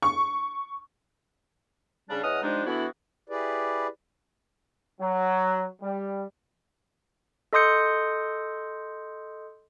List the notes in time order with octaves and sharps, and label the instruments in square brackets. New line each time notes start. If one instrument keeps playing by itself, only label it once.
[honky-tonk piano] C#6
[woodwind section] C#3 G3 D4
E2 C#4 D#5 F#5 D#6 F6
F3 G3 G#3 D4 D#4
E3 A3 B3 D4 E4 F#4
[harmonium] E4 G4 G#4 B4 D5
[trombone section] F#3
G3
[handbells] A4 D#5 C6 D#6 G6 C#7